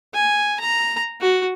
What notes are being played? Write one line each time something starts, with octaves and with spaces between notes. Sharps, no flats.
G#5
A#5
F#4